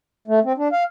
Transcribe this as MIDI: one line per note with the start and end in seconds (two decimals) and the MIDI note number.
0.28 0.40 57
0.45 0.53 60
0.57 0.68 62
0.72 0.84 77